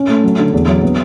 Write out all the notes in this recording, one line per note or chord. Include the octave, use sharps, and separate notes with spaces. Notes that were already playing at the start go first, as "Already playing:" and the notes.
Already playing: C#4
A3
F#3
D3
E2
F#3
B3